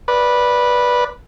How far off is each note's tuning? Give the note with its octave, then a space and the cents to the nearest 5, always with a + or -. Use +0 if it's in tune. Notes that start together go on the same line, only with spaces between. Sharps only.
B4 -10 D5 +0